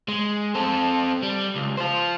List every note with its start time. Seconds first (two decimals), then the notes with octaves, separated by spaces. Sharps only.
0.08 G#3
0.55 C4 A4
1.23 G3
1.56 C#2
1.77 F4 C5